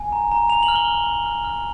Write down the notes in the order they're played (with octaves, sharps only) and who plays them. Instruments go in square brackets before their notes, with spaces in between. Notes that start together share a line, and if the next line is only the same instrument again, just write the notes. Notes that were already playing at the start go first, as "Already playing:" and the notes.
Already playing: [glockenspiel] G#5
A#5
A#5
A#5 F7
F#7
F6
G7
F6
F6
F6
F6